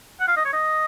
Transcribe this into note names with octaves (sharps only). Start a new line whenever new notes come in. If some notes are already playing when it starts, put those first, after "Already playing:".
F#5
F5
D#5
C#5
D#5